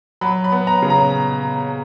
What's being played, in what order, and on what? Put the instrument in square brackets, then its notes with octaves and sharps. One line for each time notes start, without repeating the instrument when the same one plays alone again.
[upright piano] F#3 B5
B5
B3
A#5
C#3
A#5